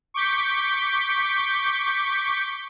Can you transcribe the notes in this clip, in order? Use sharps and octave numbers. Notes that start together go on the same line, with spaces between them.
C#6 D6 G6 B6